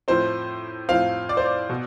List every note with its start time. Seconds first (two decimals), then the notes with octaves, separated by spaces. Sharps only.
0.08 A2 F3 C4 C5
0.89 A2 F3 C4 F5
1.29 D5
1.37 C5
1.45 D5
1.70 B2